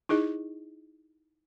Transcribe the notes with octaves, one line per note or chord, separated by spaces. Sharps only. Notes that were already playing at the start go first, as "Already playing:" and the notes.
D#4 E4 G#4 D#5